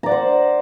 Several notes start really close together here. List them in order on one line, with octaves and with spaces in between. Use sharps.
A#5 D5 F#5 C5